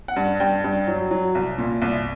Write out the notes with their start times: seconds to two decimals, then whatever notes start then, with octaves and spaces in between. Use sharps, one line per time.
0.08 F#5
0.16 G2
0.40 G2 G5
0.64 G2
0.87 F#3
1.11 F#3
1.35 C2
1.58 A#2
1.82 C2